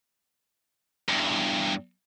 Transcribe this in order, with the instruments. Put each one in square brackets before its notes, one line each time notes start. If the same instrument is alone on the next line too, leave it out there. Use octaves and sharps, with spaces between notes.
[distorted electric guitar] E2 G2